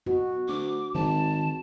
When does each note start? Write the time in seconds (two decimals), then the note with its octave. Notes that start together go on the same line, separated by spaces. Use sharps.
0.07 B2 F#4
0.48 D2 D6
0.95 G#1 D#3 A5